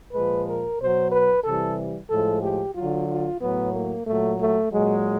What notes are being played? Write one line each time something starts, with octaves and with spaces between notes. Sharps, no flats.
A#2 F3 G#3 B4
A#4
B2 F#3 C5
B4
C3 E3 G3 A4
A2 F3 G#3 A4
G4
D3 F#3 F4
F4
A2 F#3 B3
A#3
A#2 F#3 A3
A3
A#2 F#3 G#3